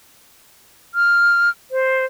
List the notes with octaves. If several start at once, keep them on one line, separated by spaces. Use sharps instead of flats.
F6
C5